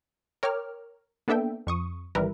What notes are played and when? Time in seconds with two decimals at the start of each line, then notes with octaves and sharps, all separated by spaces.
0.43 A#4 C#5 G5 D6 F6
1.28 A#3 B3 D4 A4 E5 G5
1.67 F2 C#6 D#6
2.15 G#1 E3 G3 A#4 B4 E5